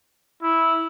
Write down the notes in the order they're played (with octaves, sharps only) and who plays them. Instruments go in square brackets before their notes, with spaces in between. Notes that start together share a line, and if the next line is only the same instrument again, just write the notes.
[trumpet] E4